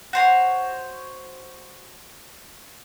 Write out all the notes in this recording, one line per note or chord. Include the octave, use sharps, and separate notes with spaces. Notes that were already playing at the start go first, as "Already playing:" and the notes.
F#4 C5 C#5